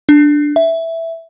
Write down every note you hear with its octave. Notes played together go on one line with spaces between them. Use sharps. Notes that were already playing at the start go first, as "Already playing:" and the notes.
D4
E5